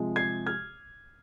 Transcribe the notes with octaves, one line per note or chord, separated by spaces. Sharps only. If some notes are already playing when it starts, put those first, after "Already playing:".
Already playing: C3 F3 G#3
G#6 C7
F6 G#6